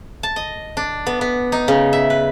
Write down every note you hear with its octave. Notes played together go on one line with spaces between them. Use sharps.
A5
D#5
D4
B3
B3
D#4
C#3
E5
B4